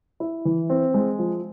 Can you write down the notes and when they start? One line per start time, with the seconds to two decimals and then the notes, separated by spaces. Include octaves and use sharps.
0.20 E4
0.45 E3
0.70 C4
0.94 G#3
1.19 F3